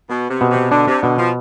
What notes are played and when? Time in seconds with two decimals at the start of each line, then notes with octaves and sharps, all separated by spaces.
0.09 B2 B3
0.30 C3
0.41 B2
0.51 C3
0.71 D3 D4
0.87 C3
1.02 B2 D3
1.18 F3